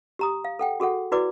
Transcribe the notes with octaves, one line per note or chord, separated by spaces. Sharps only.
G4 A#5 D#6
F5
A4 F#5 G5
F#4 G#4 A4 F#5
E4 F#4 B4 D5 D6